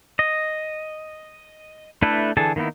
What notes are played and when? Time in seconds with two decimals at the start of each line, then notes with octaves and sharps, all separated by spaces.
0.19 D#5
2.02 A3 D4 E4 A4 B4
2.37 D3 E3 G#4 A4 A5
2.56 D#3 A#3 B3 D#4 E4